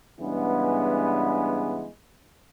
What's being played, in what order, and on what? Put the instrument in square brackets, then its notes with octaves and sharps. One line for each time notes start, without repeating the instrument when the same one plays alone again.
[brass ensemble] G2 C#3 E3 G#3 B3